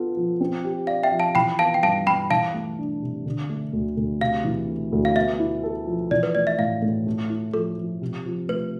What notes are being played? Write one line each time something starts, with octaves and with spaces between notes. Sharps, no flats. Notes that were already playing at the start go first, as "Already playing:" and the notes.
Already playing: B3 F4 A4
F3
C4
G4
D5 F5
E5 G5
F3
F5 A5
E3 G5 B5
B3 F5 A5
G5
G2 F5 A5
G2 G5 B5
E3 F5 A5
A3
D4
C3
D3
A3
D2
D2
C3 F5
E3
A3
D2
F5
B3 E5
E4
A4
F3
E3 D5
B4
A3 D5
E5
A2 F5
A2
A3
E4
F3 A4
F3
C3
F3
A3 B4